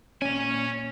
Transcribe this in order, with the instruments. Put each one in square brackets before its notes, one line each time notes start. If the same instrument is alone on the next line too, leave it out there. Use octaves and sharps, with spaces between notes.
[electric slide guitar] A#2 C#4 [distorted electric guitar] C#5 G#5